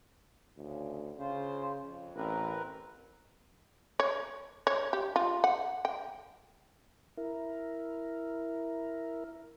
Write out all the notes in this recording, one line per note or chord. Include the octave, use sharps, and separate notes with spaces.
D2 C#3
C#3 F4 C5
F2
A1 C4 A#4 B4
C#5
C#5
G4
F4
F#5
G5
E4 A#4